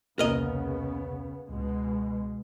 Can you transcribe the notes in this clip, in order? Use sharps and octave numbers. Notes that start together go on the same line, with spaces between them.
E1 C2 C#3 A#3 B3 A#4 D#5
C#2 B2 G#3